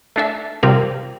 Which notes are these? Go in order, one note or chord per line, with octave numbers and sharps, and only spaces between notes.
A3 D4 A4 E5
C3 G3 C4 F4 A#4